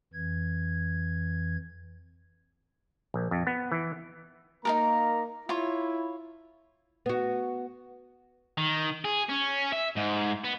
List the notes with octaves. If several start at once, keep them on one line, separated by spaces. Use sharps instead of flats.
F2 E3 G#6
A#1
F2
B3
E3
A#3 D#4 A4 A#4 A#5
E4 F4 C#5
B3 F#4
D#3
G#4
C#4
E5
G#2
B3